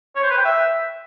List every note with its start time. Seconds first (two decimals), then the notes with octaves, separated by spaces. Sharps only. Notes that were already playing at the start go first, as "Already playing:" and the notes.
0.16 C#5
0.23 C5
0.30 B4
0.38 G5
0.45 E5